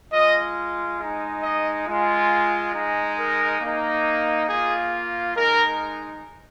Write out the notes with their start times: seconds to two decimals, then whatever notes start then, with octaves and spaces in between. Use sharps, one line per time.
0.12 G#3 F4 D#5
0.99 G#3 D#4
1.43 D#5
1.86 G#3 F4
2.73 G#3 D#4
3.18 A#4
3.61 A#3 D#4
4.48 A#3 F4 G#4
5.35 G#3 D#4 A#4